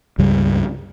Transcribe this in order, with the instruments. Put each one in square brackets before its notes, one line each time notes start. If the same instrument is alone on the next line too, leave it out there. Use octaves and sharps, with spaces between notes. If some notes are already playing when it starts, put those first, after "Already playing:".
[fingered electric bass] C#2 G2 C#3 G3